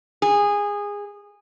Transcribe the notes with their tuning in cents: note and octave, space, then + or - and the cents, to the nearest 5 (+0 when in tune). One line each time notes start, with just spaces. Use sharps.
G#4 -20